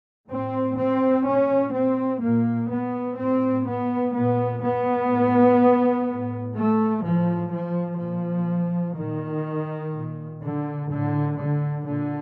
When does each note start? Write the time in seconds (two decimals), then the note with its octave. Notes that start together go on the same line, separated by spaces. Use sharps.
0.28 A2 C4
0.77 C4
1.25 A#2 C#4
1.74 C4
2.21 A#2 A#3
2.70 B3
3.18 A2 C4
3.66 B3
4.14 A#2 B3
4.63 B3
5.11 A2
6.08 A2
6.56 A3
7.04 A2 F3
7.52 F3
8.00 A#2 F3
8.97 A#2 D#3
9.93 A#2
10.41 D3
10.90 A2 D3
11.38 D3
11.86 A#2 D3